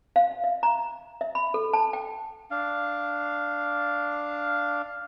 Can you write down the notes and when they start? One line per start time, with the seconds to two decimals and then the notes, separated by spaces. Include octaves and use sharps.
0.16 F5
0.44 E5
0.63 A#5
1.21 E5
1.35 B5
1.54 A4
1.73 A5
1.93 G5
2.51 D4 F5